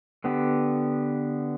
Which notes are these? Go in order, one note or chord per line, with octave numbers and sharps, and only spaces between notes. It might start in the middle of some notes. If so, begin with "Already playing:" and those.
D3 B3 G4